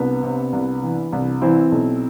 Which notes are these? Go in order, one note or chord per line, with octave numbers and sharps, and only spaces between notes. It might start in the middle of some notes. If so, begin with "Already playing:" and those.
Already playing: C2 B3 D4
C3
C2
E3
C2
E3 C4 E4
B1